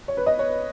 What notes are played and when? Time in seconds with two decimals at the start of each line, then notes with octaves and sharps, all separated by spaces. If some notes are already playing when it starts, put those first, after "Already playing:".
0.08 C#5
0.17 B4
0.26 D#5
0.39 C#5